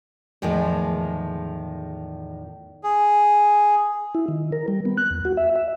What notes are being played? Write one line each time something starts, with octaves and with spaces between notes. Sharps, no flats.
E2 A2 D#3 F3 G#3
G#4
E4
D#3
A#4
G3
B3
F#6
E2
F#4
E5
E5